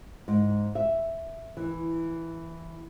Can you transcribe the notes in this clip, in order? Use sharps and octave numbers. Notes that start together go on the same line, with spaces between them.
G#2
E5
E3